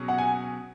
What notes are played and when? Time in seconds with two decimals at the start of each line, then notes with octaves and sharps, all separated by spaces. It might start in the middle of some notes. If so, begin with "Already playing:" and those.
Already playing: B2 F#3 C#4 G#4
0.08 F#5
0.18 G#5